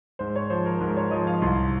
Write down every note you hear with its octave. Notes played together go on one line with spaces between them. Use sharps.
G#2 C5
C#5
F3 C5
A#4
G#2 A#4
C#5
F3 D#5
F5
C2 C6